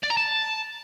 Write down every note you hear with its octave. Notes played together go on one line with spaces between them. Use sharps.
D5
A#5
A5